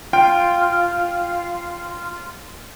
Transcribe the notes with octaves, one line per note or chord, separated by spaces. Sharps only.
F4 G5